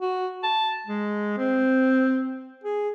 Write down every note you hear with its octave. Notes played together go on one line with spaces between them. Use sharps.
F#4
A5
G#3
C4
G#4